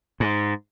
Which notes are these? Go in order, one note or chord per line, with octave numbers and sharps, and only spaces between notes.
G#2